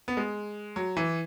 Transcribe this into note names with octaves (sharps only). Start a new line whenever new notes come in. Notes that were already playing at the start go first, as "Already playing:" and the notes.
B3
G#3
F#3
E3